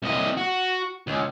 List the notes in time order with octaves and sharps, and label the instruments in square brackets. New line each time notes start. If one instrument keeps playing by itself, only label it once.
[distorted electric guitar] C2 D#5
F#4
C#2